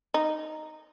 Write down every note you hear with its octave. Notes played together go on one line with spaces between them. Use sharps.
D#4